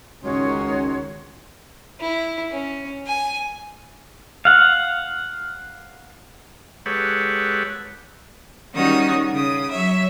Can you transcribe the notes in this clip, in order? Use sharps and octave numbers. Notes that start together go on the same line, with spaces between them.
C#2 D#3 G#3 C#4 F#4 C#5 C6
E4
C#4
G#5
F5 F#5
G#3 G4 A4 B4 C#5 F#5
D#3 G3 C#4 D#4 F#4 D#6
C#3 D#6
F#3 C#5 E5